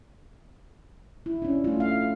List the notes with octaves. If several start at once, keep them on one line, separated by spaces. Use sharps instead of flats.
E4
C#4 D4
A3 F4
F5